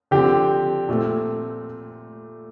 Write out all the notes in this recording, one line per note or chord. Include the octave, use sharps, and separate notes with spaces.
D3 F3 C4 G4
A#2 A3 C4